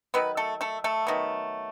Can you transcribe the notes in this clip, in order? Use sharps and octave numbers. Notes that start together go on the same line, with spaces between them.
D#3 F#3 B3 B4
A3 A4
A3 A4
A3 A4
D#3 F#3 B3